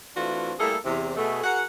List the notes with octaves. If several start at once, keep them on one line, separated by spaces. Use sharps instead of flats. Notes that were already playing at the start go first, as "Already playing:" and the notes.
E3 A3 C4 D4 F4 F#4
G3 A3 A#3 E4 G#4 A4
E2 C3
B2 A3 G#4
F#4 G#4 A#4 F#5